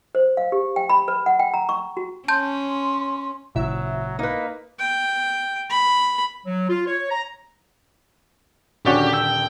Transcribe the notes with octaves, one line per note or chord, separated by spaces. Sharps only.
C5
F5
G4
G5
B5
B4
F#5
G5
A#5
C#6
F#4
C#4 A5 C6 G6
G#1 A#2 C#3 E3 F#3 E4 E5
A#3 D#4 B4
G5
B5
F#3
F4
C#5
A#5
D#1 D3 C#4 F#4 G4 D5
G5 E6